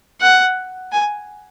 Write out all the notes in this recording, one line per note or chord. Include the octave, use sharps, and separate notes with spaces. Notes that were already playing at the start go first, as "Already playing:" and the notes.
F#5
G#5